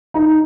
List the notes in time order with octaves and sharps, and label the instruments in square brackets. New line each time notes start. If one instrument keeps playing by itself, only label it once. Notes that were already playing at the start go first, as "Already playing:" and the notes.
[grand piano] D#4